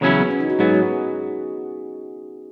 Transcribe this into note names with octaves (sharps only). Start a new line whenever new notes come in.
E2 C#3 F#3 C#4 E4 G#4
F#4
B3
C#4
D#4
F#4
G#2 F#3 B3 G#4
F#4